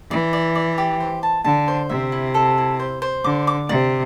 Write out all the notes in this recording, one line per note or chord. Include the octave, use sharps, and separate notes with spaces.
E3 D5
D5
D5
G4
C5
A5
D3 A5
C5
C3 E5
E4
A4
E4
C5
C5
D3 D6
D6
C3 D5